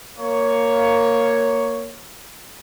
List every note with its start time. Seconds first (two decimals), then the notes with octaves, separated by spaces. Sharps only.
0.18 A#3 C#5